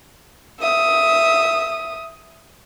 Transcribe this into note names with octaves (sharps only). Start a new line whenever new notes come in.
E5 D#6